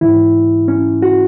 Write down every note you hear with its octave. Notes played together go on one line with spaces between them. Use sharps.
G#2 E3 E4
C#4
F#4